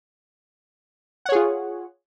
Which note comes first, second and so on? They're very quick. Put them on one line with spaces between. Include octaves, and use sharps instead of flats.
F#5 C#5 G#4 F4